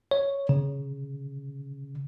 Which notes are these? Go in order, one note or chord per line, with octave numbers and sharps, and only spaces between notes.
C#5
C#3